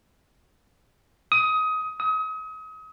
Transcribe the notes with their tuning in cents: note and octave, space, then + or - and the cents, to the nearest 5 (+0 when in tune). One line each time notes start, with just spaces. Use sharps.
D#6 +20
D#6 +35